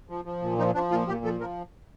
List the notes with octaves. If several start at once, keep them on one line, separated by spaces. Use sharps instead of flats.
F3
F3
A#2
F3 D#4
F3 D4
A#2 F4
A#2 G4
F3 A4
F3 A#4